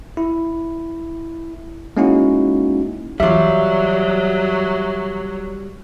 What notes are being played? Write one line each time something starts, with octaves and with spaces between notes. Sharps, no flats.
E4
G#3 A#3 C#4 D#4 E4 F#4
E3 F#3 G3 C4 F4 E5